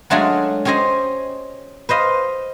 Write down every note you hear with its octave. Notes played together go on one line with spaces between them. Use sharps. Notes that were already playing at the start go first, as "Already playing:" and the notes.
F#3 G#3 A3 D4 F4 G#4
C#4 G4 G#4 C5 D#5
B4 C5 D#5 F5